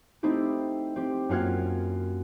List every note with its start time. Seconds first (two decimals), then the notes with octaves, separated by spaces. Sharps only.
0.23 A3 C4 D#4 E4 G4
0.96 C4 G4
1.29 F#2 A#3 F4 F#5 F6 G#6